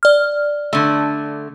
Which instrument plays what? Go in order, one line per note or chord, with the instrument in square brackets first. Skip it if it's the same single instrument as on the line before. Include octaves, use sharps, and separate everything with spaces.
[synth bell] D5 F6
[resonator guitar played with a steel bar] D3 A3